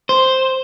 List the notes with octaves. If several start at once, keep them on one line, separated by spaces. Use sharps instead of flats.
C5